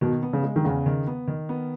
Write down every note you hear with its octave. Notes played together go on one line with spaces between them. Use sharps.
B2 D#3
B3
C#3
G#3
D#3
E2 C#3
D#3
B3
D#3
B3